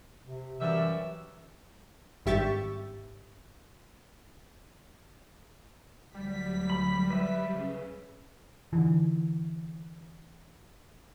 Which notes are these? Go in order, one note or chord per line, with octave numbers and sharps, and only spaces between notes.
C3
F#2 E3 G3 E5
G#1 G2 G4 E5 C#6 A6
D2 F#3 G3 B6
B5
B4 E5
C#3
D3 E3